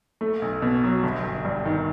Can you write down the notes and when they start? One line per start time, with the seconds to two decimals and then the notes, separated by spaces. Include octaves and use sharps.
0.21 A3
0.42 B1
0.62 B2
0.84 F#3
1.03 G1
1.24 G1
1.45 G2
1.65 D#3